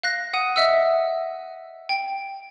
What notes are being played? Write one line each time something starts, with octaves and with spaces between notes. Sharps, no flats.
F5 F#6 A#6
F#5 D#6 D#7
D#5 E5 F#5 E6
G5